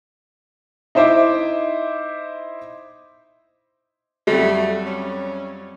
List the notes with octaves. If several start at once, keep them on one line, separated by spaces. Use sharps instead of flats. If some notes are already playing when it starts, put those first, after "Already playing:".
D#4 E4 C5 E5 D6
F2 F#3 G3 A3
C#4